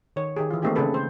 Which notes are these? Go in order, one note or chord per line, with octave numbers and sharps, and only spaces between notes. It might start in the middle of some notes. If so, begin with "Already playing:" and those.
D#3 C#5
D#3 G4 G#4
E3 F4
A3 A#3 C4 D#4 G4 G#4
C#3 A3 C4 G#4 A4 B4
C5